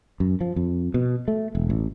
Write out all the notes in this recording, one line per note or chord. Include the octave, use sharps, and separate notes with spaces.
F#2
F3
F2
B2
A3
E1
A1